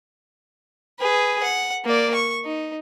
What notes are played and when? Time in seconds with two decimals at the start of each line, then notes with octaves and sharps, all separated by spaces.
0.99 G#4 B4
1.43 F#5
1.85 A#3 D5
2.15 C#6
2.44 D#4